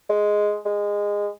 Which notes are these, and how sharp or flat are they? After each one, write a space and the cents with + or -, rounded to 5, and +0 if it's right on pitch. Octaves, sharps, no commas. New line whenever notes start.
G#3 +0
G#3 -20